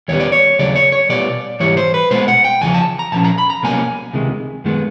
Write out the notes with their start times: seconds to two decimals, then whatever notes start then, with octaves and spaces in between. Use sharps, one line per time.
0.08 D#2 D#3 G3 B3 C#5
0.20 D5
0.32 C#5
0.59 D#2 C#3 F#3 D5
0.76 C#5
0.92 C#5
1.09 B2 G3 B3 D5
1.60 G#2 E3 G3 C#5
1.77 C5
1.94 B4
2.11 B2 G#3 B3 C5
2.28 F#5
2.45 G5
2.61 E2 C#3 F3 G#5
2.74 A5
2.99 A#5
3.12 A#2 F3 C#4 A5
3.24 A#5
3.38 B5
3.50 A#5
3.63 C2 B2 F#3 A#3 C#4 G#5
4.13 C#2 C3 D#3 G#3
4.64 F#2 D#3 G#3 B3